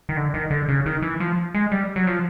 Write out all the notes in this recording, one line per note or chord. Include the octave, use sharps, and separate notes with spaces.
D#3
D3
D#3
D3
C#3
D#3
E3
F3
G#3
G3
F#3
F3